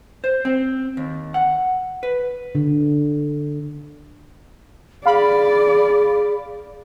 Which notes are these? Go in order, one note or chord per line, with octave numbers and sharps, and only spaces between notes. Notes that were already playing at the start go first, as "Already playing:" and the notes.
C5
C4
D#2
F#5
B4
D3
G#4 D5 F5 B5